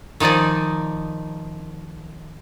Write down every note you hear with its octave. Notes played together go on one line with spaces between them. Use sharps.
D#3 F3 D#4 D5 G#5